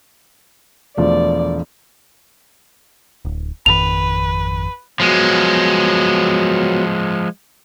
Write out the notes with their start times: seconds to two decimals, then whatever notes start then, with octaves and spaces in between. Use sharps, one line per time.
0.97 E1 F3 A3 D5
3.25 D1
3.66 G#1 F2 D#3 B4 F7
5.00 F3 F#3 G#3 B3